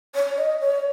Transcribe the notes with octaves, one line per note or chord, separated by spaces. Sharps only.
C#5
D#5
C#5